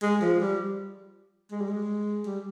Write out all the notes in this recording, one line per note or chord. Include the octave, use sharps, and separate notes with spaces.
G#3
F3
G3
G#3
G3
G#3
G3